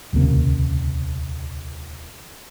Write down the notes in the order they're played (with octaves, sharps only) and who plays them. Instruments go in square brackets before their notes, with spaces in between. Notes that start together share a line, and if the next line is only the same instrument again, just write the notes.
[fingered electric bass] D#1 C#2 C3 A#3